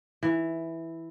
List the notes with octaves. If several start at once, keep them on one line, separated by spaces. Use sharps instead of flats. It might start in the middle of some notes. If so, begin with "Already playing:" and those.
E3